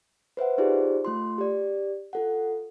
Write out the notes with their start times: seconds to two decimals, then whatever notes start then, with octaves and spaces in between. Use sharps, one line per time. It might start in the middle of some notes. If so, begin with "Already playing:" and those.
0.37 B4 C5 E5 F#5
0.58 D#4 F4 G4 G#4 C5 D5
1.05 A3 F4 C6
1.38 G4 D5
2.13 F4 A4 F#5